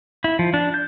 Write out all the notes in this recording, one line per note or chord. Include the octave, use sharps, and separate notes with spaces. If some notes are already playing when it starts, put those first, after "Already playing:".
E4
F3
D4
G6